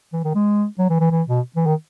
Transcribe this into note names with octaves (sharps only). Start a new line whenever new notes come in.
E3
D#3
G#3
F#3
E3
E3
E3
B2
E3
D#3